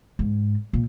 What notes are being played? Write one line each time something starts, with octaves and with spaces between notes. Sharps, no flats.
G#2
A#2